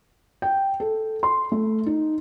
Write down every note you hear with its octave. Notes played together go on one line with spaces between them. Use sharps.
G5
A4
C6
A3
D#4